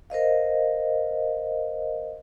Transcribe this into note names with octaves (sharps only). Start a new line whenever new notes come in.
A#4 C5 D#5 F5